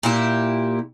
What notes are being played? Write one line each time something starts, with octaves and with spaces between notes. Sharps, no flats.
A#2 E4 G4